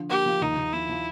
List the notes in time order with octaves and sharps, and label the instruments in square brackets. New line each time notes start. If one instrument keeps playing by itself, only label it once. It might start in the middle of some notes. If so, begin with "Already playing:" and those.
Already playing: [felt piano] D3 F3
[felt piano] A#3 [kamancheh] G4
[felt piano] F3
[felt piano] D#2 [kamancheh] D#4
[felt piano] D#2
[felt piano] F3 [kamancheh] E4
[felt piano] F3